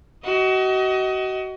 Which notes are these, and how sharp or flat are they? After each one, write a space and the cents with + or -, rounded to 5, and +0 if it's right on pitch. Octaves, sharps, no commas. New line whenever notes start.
F#4 +35 D#5 +25